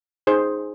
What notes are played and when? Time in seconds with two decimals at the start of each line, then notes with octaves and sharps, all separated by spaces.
0.27 D#4 G#4 C5